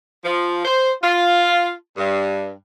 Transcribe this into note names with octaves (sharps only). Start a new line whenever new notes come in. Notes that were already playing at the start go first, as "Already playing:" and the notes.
F3
C5
F4
G2